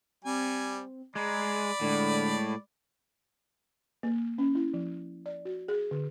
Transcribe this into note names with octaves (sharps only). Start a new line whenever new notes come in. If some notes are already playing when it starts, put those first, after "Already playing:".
G3 C4 G#5
G#3 D5 A#5 B5
A2 D3 G#3
A#3
C#4
E4
F3
D5
F#4
G#4
D3